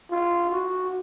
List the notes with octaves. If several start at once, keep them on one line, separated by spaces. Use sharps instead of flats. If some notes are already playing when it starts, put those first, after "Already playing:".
F4
F#4